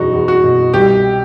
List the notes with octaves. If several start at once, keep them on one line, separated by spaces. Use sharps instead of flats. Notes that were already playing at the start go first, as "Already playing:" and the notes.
Already playing: F#1 E2 B2 D#4 F#4
E2
F#4
B2
C2 G4